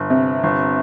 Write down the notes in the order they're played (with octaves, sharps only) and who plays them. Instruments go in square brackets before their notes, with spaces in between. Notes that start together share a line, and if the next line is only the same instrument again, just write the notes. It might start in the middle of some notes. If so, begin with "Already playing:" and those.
Already playing: [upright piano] G1
C3
G1